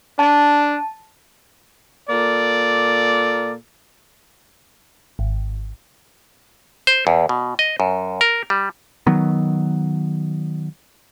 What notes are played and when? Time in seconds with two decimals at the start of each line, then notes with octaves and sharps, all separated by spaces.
0.19 D4 A5
2.10 A#2 A#3 A4 D5
5.19 G#1
6.87 C5
7.07 E2
7.29 B2
7.59 D#5
7.80 F#2
8.21 A#4
8.50 G3
9.07 D#3 F#3 B3